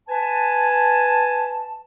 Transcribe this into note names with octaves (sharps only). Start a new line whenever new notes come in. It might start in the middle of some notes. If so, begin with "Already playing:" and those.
B4 G#5 A5